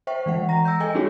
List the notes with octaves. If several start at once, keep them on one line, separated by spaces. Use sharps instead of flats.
C5 E5 G5 C#6
E3 G#3 F#5
A#5 A#6
E6 G6
A4 D#5 G5 G#5
G#3 D4 D#4 F#4 G#4 C#5